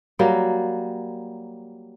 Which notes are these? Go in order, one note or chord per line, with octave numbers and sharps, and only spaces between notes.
F#3 G3 A#3